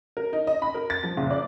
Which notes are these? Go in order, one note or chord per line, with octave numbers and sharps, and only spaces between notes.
A#4
D#4
D#5
B5
A#4
A6
F3
F#1
D5